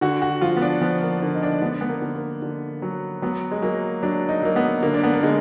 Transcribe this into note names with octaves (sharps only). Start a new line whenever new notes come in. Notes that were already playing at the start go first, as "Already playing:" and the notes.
D3 F#4
F#4
F3 F4
B3
D4
F3 B3
A#3
D3 A#3
D#4
D4
D3 B3
B3
A#3
D3
A#3
D3
F#3
F#3 B3
G#3
F#3 A#3
F#3 D4
D#4
F#3 A#3
B3
D3 A#3
D4
B3
A#3
D3 G#3